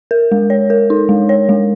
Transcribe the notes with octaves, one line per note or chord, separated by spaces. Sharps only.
A#4
G#3
C#5
A#4
D#4
G#3
C#5
G#3